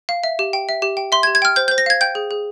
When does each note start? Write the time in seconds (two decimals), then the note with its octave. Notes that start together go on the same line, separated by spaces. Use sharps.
0.09 F5
0.24 E5
0.39 G4
0.53 G5
0.69 E5
0.82 G4
0.97 G5
1.12 E5 C6
1.23 G#6
1.27 G4
1.35 G#6
1.42 G5 F6
1.56 C5 G6
1.68 C5 G6
1.78 A#6
1.86 F5 G#6
2.01 G5 G6
2.15 G#4
2.31 G#4